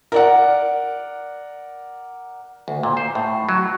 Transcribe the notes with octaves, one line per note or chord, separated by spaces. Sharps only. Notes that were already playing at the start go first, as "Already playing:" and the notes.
A#4 D5 F#5
D2
A#2
C5
A2
F#3